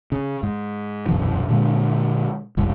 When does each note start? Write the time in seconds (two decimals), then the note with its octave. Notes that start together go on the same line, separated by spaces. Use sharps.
0.12 C#3
0.43 G#2
1.09 E1 C2 F#2 E3
1.48 A#2 D3 G#3
2.57 F#1 C2 G#2